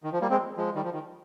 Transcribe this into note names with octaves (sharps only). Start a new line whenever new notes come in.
D#3
F3
G3 A#3
G#3 C4
F3 G#3
D#3 G3
F3
D#3